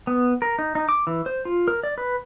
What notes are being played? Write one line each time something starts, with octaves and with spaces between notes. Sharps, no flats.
B3
A#4
D#4
D#4
D6
E3
C5
F4
A#4
D5
B4